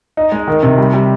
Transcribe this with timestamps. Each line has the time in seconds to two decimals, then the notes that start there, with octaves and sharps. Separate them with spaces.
0.17 D#4
0.32 G#3
0.48 D#3
0.63 C3
0.78 G3
0.93 G3